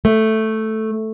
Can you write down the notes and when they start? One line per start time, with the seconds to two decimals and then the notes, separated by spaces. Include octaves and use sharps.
0.05 A3